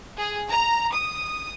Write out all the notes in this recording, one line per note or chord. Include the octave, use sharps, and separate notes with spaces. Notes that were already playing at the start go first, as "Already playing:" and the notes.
G#4
A#5
D#6